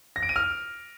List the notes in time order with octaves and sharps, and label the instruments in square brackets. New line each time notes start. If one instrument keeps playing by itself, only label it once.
[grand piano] A#6
D7
D#7
F6